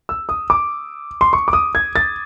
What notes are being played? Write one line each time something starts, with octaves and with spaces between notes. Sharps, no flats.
E6
D#6
D6
C6
C#6
D6
D#6
G#6
A6